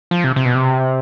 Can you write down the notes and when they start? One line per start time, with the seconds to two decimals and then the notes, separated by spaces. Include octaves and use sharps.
0.11 F3
0.24 C3
0.36 C3
0.45 B2
0.55 C3